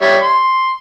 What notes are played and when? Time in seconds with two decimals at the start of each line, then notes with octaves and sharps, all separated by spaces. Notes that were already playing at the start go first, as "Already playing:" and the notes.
0.02 G3 C#5 E5
0.22 C6